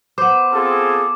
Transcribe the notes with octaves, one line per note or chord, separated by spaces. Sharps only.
B3 C5 D6
C4 F4 G#4 A4